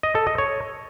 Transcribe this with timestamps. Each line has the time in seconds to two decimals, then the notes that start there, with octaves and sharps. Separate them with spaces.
0.03 D#5
0.15 A4
0.27 D#5
0.38 C#5